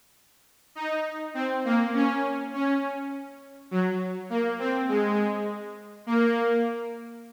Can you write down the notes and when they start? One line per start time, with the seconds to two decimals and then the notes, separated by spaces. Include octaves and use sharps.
0.75 D#4
1.34 C4
1.65 A#3
1.94 C#4
2.54 C#4
3.71 F#3
4.30 A#3
4.59 C4
4.89 G#3
6.07 A#3